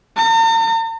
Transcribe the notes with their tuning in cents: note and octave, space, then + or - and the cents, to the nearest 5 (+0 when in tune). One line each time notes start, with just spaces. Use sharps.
A#5 -45